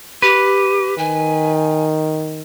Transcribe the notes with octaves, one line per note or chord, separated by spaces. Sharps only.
G4 B4
D#3 G#5